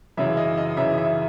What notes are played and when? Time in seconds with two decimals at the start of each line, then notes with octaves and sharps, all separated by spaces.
0.17 F#2 C#3 E3 E5
0.37 D#5
0.57 D#5
0.77 F#2 C#3 E3 E5
0.98 E5